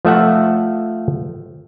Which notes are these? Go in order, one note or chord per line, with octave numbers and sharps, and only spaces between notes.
F3 A3 E5 F#5